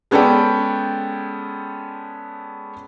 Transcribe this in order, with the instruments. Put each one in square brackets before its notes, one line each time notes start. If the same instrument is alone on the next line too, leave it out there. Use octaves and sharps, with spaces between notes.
[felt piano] G#3 B3 C#4 A4 D5 G5